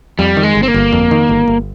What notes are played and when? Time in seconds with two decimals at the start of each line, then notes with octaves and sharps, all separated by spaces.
0.19 F2 G3
0.37 D#3
0.43 G#3
0.55 G1
0.63 C4
0.68 A#3
0.74 G1
0.93 F2
1.11 D#3
1.29 G1
1.48 G1